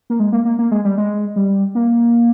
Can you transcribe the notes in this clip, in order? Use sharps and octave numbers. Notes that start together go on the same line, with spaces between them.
A#3
G#3
A#3
A#3
A#3
G#3
G3
G#3
G3
A#3